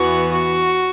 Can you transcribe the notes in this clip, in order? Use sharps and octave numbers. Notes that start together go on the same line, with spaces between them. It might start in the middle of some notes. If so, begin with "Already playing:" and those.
Already playing: E2 E3 B3 F#4
F#4